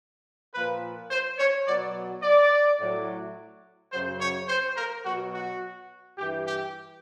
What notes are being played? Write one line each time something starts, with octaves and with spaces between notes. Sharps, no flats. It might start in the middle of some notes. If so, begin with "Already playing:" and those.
A#2 F3 B4
C5
C#5
B2 F#3 D5
D5
A2 F#3
F#2 C#3 F#3 C5
C#5
C5
A#4
B2 F#3 F#4
F#4
G2 E3 G4
G4